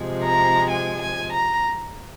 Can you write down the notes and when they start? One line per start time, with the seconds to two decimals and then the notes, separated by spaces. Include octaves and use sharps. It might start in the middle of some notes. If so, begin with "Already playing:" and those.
Already playing: C3 F3 G#3
0.23 A#5
0.69 G#5
1.00 G#5
1.31 A#5